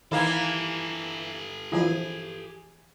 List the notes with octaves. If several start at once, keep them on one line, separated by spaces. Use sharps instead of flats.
D#3 E3 A#3 E4 G4 A4
E3 F3 E4 G#4